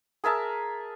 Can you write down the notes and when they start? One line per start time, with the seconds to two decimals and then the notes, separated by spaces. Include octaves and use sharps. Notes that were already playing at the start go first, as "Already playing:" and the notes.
0.24 G#4 A#4 E5 A5